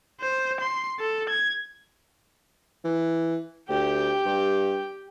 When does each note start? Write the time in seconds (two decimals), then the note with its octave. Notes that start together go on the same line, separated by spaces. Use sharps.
0.21 C5
0.60 C6
0.99 A4
1.29 G#6
2.84 E3
3.69 D2 G4 G5
4.26 G2